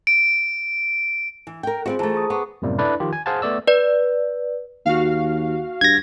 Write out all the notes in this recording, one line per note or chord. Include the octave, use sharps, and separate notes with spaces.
D7
E3
A#4 G5
G3 C4 F4 F#4 G#4 C5
E3 A3 C5 A5 A#5
G#4 C#6 D#6
B3 F#5 C#6 D6
F#2 A2 C3 G3 A#3
D4 E4 A4 B4 D5
D#3 F3 F4 G4
G#5
G#4 C5 F5 F#5 G#5 A5
A3 B3 D5 E6
B4 D5
D#2 F#4 F5
G2 G#6 A#6